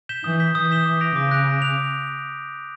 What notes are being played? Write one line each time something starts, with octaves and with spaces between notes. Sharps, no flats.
G6 B6 E7 G7
E3 D#6
G6 B6 E7 G7
E3 D#6
G6 B6 E7 G7
D6
F#6 A#6 D7 F7
C#3 D6
F#6 A#6 D7 F7
D6
F#6 A#6 D7 F7
D6